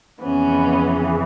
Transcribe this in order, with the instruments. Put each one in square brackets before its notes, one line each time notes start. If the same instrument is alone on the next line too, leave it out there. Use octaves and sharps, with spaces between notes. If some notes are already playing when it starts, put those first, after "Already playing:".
[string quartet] F2 C#3 E3 B3 C#4